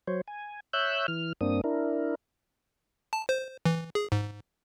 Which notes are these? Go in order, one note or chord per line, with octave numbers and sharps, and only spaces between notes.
F#3 C5 C#5
G#5
C#5 E5 E6 F#6 G6
E3 F6
G2 A#3 C4 D4 D#6
D4 E4 A#4
A5
C5
E3
G#4
G#2